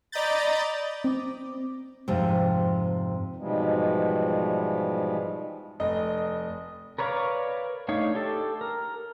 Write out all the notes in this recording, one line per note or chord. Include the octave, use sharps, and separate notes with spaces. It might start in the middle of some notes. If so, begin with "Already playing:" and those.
D5 D#5 A#5 B5 G6 A6
C4 D6
F2 G#2 C3
G#2 B2 E3 F3 G3 G#3
F1 D#5
A#4 B4 C#5 D5 F5
A3 D4 D#4 C#5 F5
G4 A4
A#4